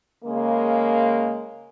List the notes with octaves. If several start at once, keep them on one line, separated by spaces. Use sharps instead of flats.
C#3 G#3 A#3